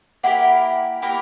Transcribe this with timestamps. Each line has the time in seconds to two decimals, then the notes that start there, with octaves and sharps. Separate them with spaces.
0.23 A#3 E4 G4 A#4 F#5
1.02 A#3 E4 G4 A#4